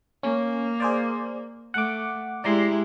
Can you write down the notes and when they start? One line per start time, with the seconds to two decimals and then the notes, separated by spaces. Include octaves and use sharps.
0.23 A#3 C#4
0.80 G#4 C5 D5
1.74 A3 F#5 D6
2.44 G#3 E4 G4 D5 A#5 C6